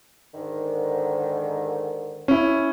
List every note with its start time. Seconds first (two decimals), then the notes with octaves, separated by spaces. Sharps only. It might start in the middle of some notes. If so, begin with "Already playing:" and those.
0.35 G#2 D3 D#3
2.28 C#4 E4